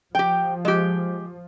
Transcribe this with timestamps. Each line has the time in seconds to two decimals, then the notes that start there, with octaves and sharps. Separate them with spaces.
0.15 F3 G4 G5
0.65 G#3 G4